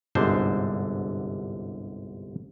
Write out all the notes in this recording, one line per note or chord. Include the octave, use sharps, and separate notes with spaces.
G1 C2 G#2 D3 C5